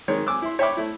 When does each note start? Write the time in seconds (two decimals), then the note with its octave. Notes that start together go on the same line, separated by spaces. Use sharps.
0.08 D#3 G#3 C#5
0.27 G#5 D6 E6
0.42 E4 C6
0.59 C#5 E5 G5 B5 D6
0.77 A3 E4